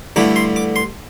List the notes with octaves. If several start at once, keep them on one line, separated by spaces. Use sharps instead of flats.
G2 D3 A3 E4 D6
C6
D6
C6